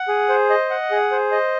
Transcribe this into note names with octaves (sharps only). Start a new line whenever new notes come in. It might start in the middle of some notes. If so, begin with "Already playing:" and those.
Already playing: F#5
G#4
C5
D#5
F#5
G#4
C5
D#5